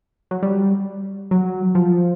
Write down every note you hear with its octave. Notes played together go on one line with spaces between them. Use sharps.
F#3
G3
F#3
F3